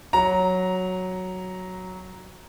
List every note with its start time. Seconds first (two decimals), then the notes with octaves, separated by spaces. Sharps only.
0.13 F#3 A#5